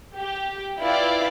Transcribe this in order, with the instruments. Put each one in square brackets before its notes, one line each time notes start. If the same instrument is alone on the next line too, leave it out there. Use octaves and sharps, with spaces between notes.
[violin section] G4
E4 F4 B4 D5 F5 G5